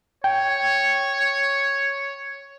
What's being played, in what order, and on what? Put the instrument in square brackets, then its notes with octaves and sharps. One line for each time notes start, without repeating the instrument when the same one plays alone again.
[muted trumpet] C#5 [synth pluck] G5